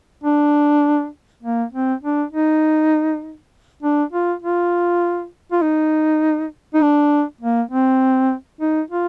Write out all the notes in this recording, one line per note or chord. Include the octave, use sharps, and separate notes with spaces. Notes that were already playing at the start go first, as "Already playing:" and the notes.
D4
A#3
C4
D4
D#4
D4
F4
F4
F4
D#4
D#4
D4
A#3
C4
D#4
F4